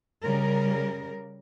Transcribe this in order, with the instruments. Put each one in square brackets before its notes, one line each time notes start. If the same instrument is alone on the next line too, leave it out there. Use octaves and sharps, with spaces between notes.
[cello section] C#3 G3 A#4